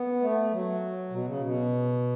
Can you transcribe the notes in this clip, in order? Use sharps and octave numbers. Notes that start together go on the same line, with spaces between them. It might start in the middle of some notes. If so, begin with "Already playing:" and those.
Already playing: B3
A3
F#3
B2
C#3
B2